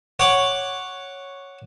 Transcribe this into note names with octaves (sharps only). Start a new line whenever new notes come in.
C#5 F#5 D6